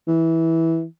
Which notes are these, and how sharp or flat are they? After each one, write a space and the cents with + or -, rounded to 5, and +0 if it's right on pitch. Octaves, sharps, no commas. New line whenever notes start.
E3 -10